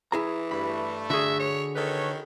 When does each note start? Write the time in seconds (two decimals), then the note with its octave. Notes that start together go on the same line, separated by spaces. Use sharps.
0.12 E3 E4 G#4 A#5
0.51 G2 A3 B5
1.10 D3 F#4 G#4 E5
1.40 C#5
1.76 D#3 A4 B4 C#5